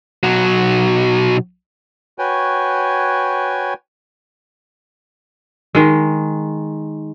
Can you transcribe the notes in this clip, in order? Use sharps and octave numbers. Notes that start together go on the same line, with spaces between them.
B1 F#3
F#4 B4 C#5 G5 G#5
D#3 G#3